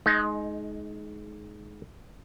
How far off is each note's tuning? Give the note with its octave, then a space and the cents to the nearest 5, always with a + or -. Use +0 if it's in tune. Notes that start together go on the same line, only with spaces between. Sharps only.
G#3 +25 D#4 +0